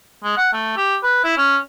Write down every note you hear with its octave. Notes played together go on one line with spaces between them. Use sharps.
G#3
F#5
A3
G4
B4
E4
C#4